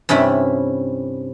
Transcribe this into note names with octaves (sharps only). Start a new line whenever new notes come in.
G2 C3 C#4 E4 B5